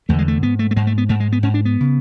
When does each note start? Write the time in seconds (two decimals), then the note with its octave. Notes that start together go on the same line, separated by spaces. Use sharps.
0.09 E2 D3 A3
0.19 G#3
0.28 A3
0.43 G#2 B3
0.59 A3
0.71 A3
0.76 G#2 G#3
0.87 A3
0.98 B3
1.09 G#2 A3
1.20 G#3
1.32 B3
1.43 G#2 C#4
1.54 D4
1.65 B3
1.80 C#3